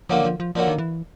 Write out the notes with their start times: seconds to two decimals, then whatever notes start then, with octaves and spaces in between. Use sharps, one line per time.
0.10 D3 F3 F#3 A#3 D4
0.25 F3
0.40 F3
0.55 D3 F3 F#3 A#3 D4
0.68 D#3
0.78 E3